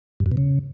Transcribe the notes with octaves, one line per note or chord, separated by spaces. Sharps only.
G2
F#2
B2
C#3